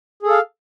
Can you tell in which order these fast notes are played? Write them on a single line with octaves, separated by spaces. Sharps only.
G#4 A4 F5